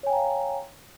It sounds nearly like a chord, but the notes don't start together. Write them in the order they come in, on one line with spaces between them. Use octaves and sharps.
C#5 G#5 G5 A#5 F5